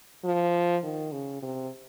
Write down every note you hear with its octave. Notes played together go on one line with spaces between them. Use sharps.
F3
D#3
C#3
C3